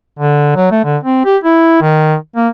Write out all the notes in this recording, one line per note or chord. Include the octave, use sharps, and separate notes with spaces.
D3
F#3
A3
D3
C4
G4
E4
D#3
A#3